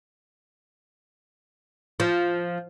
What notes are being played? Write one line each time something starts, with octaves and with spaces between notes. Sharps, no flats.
F3